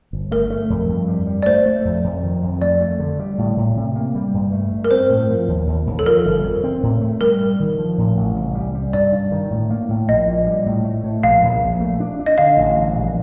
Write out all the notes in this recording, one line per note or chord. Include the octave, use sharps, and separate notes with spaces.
G1
A3 A#4
A3
F2
G2
G3
G3
D5
A3 C5
A3
F2
F2
D#3
F2
A3 D5
A3
D3
G3
A2
A2
C3
A#3
G3
G2
A3
G2
A#4
C4 C5
A2
F3
D#2
D#2
D#2
A4
F3 A#4
G1
F2
C4
A2
A3
G3 A#4
G2
D#3
F3
A2
A1
C2
G3
G3
G2 D5
G2
D#3
A2
A#3
A2
A#1 D#5
A#2
G3
A2
A3
A2
A#1 F5
A#1
A#1
A3
D4
D4
D#5
D3 F5
A1
G2
A#1